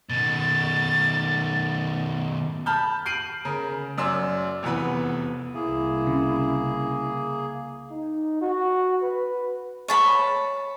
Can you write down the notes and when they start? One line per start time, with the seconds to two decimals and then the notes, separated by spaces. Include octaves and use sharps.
0.09 B2 D#3 A6
2.66 A5 B5 F6 G6
3.06 G6 C7 D7 D#7 F#7
3.45 C#3 A#4
3.98 F#2 D5 C6 E6
4.63 F1 E2 B3 B4 B5
5.55 C2 A#3 E4 G#4
6.07 C#3
7.90 D#4
8.41 F#4
9.02 B4
9.88 C#5 A5 B5